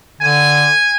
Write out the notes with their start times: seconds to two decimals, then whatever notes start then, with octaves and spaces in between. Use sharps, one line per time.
0.21 D3 G#5